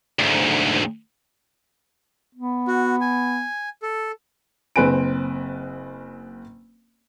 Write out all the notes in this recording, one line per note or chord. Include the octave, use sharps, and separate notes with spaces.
D2 G#2
B3
F#4
G#5
A4
F#1 C4 B4 G#5 D7